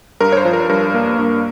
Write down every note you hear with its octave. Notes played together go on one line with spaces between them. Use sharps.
G2 A#4
C#5
C5
F3
A#4
G2 A#4
A#3
G2